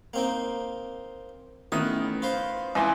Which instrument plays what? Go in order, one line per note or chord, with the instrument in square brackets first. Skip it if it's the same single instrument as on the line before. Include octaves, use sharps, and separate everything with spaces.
[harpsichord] A#3 C4 D#4
[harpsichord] A1 E4 D#6 [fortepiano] D#3 B3
[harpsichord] F4 B4 C5
[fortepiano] C#2 E3 C6